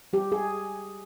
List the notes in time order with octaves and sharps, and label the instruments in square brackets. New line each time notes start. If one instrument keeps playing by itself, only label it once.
[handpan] G3 G4
G#4